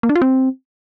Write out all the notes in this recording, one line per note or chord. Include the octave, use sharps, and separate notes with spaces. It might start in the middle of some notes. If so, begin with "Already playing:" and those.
A#3
D4
F4
C4